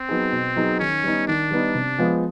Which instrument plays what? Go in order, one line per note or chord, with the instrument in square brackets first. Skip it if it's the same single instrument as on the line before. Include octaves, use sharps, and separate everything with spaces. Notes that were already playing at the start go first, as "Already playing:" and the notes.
Already playing: [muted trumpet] C4
[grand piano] F#3 B3 D#4 G#4
B2
F#3 B3 D#4 G#4
[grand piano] D#3 [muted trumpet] C#4
[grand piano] G3 B3 D#4
[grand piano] D#3 [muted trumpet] D4
[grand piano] G3 B3 D#4
C3
F3 G#3 B3